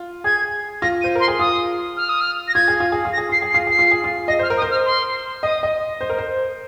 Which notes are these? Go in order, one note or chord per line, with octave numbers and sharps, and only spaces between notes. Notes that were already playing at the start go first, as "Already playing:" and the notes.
Already playing: F4
G#4 G#6
F4 A#6
D#7
C5
A#4 C6
G#4
F4 D#6
F6
D#6
F6
A#6
F4 G#6
G#4
F4
G#4
F4
A#6
G#4
F4 C7
G#4
C7
F4
G#4 C7
F4
G#4
F4
D#5 A#6
C5 F6
A#4
D#6
C5
F6
C6
D#5 D#6
D#5
C5
A#4
C5